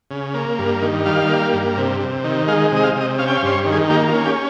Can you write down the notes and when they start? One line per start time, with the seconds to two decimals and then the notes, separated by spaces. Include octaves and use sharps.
0.11 C#3
0.34 A#3
0.58 G2
0.82 D#3
1.05 G3 F5
1.29 A#3
1.53 G2
1.77 C3
2.00 C3
2.24 D#3
2.48 G#3 F5
2.72 C3 D#5
2.83 F5
2.95 C3
3.01 D#5
3.18 C#4 F5
3.28 G5
3.37 F5
3.43 G2 C5
3.54 C#5
3.66 D#3
3.72 G#4
3.90 A#3 G4
4.08 F4
4.13 C#4
4.25 G4